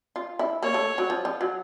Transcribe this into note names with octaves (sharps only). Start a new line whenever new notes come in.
F4
E4
A#3 C#5
A3
F#3
F3
F3
F#3